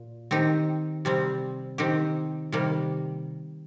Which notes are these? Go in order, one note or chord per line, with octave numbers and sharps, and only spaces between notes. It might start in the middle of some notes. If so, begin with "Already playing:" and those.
Already playing: A#2
D#3 C4 D#4 G4
C3 G3 C4
D#3 C4 D#4 G4
C3 D#3 G3 A#3